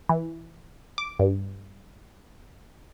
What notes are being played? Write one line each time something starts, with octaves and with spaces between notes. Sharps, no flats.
E3
D6
G2